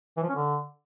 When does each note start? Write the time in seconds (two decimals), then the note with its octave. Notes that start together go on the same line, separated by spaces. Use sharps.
0.17 E3
0.23 F3
0.29 C#4
0.35 D3